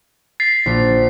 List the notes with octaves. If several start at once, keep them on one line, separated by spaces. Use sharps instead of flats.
A6 B6 C7
A#1